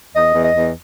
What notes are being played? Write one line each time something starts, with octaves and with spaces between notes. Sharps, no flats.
E2 D#5
E2
D#5
E2